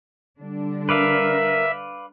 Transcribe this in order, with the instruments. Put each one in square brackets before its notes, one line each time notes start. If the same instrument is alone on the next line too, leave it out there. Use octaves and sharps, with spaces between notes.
[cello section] D3 G3 D4
[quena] A#4 [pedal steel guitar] B4 D5 F5 [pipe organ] E5